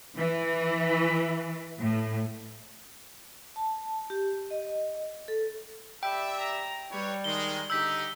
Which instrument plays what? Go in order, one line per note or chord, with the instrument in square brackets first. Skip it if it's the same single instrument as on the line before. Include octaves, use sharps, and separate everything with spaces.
[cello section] E3
A2
[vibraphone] A5
G4
D#5
A4
[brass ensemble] G4 D5 E5 [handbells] G5 [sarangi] B5
[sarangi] A#5
[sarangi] G3 [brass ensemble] B4 C#5
[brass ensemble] D#3 G#3 [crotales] G7
[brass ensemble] D3 D#4 [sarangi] G4 [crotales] E6 G6 B6